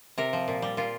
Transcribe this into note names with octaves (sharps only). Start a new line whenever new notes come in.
C3 A#4
F3
A#2
G3
A#2 F4